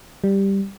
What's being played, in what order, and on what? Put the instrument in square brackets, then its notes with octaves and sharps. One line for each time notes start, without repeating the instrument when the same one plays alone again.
[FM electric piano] G3